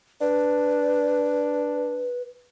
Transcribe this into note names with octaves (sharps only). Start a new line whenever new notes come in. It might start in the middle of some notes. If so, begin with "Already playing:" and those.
D4 B4